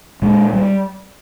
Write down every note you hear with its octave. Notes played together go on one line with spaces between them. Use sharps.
A#2 G#3
G3